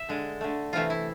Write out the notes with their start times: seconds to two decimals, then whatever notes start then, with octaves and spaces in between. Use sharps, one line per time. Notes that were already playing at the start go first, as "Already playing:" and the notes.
Already playing: E5
0.09 D3 G#3
0.41 D3 A3
0.73 C3 E3 A3 F4
0.90 E4